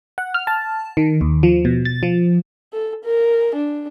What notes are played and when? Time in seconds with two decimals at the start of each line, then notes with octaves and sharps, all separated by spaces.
0.18 F#5
0.34 F6
0.47 A5
0.97 D#3
1.21 D#2
1.43 F3
1.65 B2
1.85 A6
2.03 F3
2.73 A4
3.04 A#4
3.55 D4